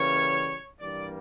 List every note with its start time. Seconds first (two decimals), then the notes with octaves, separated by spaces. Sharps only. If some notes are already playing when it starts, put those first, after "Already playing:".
Already playing: C#3 E3 G3 A#3 C#5
0.79 G2 E3 G3 A#3 D5